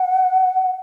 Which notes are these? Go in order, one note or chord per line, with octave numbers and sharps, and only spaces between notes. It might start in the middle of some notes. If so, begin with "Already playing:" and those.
Already playing: F#5